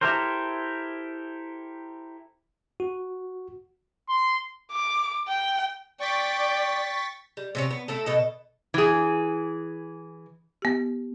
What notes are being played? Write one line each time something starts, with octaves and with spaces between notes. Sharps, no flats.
E4 G4 A4 A#4 C5
F#4
C6
D6
G5
D5 G5 C#6 A6 B6
G3
C3 C4 C#4
B3
A3 E4 A4
B2 A4 D#5
E3 G#4
B3 G4